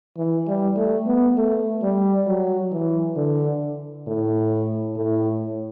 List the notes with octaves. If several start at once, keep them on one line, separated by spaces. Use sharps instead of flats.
E3
G3
A3
B3
A3
G3
F#3
E3
D3
A2
A2